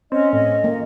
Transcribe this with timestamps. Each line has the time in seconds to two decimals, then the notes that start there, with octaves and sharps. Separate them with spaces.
0.12 C4 C#4 D#5
0.33 A2 D#5
0.64 A#3